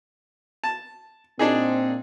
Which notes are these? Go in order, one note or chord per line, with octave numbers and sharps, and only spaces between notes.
A5
A#2 C4 D4 D#4 G#4